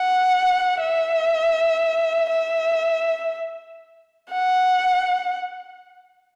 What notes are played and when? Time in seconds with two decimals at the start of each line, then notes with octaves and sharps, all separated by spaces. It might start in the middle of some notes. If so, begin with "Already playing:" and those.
Already playing: F#5
0.81 E5
2.31 E5
4.31 F#5